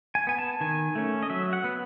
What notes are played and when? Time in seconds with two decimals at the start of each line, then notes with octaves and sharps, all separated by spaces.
0.15 G#5
0.27 B3 G#5
0.38 A5
0.61 D#3 G#5
0.95 A3 C#4
1.23 D#5
1.30 F#3 E5
1.53 F#5
1.64 B3